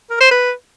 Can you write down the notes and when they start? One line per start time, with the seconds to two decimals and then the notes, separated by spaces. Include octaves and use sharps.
0.10 A#4
0.21 C5
0.31 B4